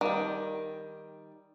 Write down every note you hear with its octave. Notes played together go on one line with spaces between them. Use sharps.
D#3 G3